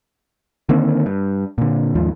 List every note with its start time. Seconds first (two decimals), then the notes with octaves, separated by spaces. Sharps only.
0.69 D3 D#3 A#3 C4
1.06 G2
1.58 A#2 D3
1.95 D#2 G#2 F3